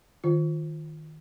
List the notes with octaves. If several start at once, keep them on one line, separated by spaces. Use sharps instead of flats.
D#3 F4